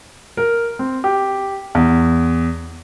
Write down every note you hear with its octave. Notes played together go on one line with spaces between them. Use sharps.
A#4
C4
G4
E2